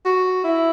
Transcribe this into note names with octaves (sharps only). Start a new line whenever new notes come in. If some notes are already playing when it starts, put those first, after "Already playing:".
F#4
E4